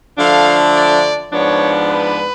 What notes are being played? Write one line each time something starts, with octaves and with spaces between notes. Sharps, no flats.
D3 F3 A3 D4 F5
D5
G#2 F3 B3 D4 C#5
B4